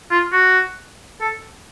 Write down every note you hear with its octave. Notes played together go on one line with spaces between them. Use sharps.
F4
F#4
A4